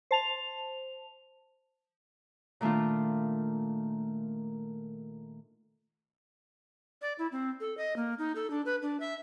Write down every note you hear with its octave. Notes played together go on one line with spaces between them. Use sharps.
C5 A5 F7
A#2 D#3 A3 D4 F4
D5
E4
C4
A4
D#5
A#3
D#4
A4
D4
B4
D4
E5